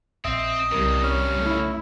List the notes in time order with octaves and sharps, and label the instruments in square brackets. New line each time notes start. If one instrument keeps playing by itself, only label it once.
[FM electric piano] A#1 E5 [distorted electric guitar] C4 [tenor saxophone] D#5
[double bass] C2 G3 [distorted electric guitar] G2 C#3 [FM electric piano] A#4
[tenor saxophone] C#4
[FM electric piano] A3 [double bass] E4